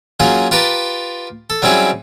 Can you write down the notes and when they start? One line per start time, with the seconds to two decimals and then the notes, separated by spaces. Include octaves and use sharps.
0.20 F#3 A#3 C#4 F4 G#4
0.51 F4 G4 A#4 B4 A5
1.50 A4
1.62 F#3 G3 C4 C#4 E4 G#4